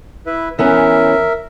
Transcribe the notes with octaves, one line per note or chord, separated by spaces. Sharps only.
E4 B4 E5
E3 B3 C#4 A#4 E5